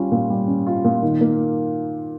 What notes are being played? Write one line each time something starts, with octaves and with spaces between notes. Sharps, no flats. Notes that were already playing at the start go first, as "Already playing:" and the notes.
Already playing: G3 C#4 F4
A#2
G3
C#4
F4
A#2
D#3
A#3